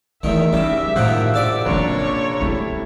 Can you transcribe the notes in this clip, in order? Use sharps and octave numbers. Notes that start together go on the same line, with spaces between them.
E2 D#3 A3 E5
C#3 G3 D#4 E7
A2 C3 D#3 F3 C5 F#5 F#6
A#1 D5 D6 E6
F#2 C3 A#3 D4 C#5
G3 A3 B3 C4 E4